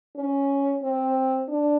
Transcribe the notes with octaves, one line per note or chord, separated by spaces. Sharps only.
C#4
C4
D4